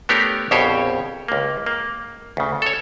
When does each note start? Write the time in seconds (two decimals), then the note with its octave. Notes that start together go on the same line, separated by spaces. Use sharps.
0.09 A3 B3 D4 G4 A#4 C#5
0.51 A#1 F2 B2 G4 C5 C#5
1.28 C#2 A#3
1.66 A#3
2.37 D2 C#3
2.62 A4 C#5